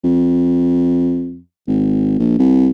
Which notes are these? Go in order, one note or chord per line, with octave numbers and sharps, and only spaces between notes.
F2
G#1
A#1
C2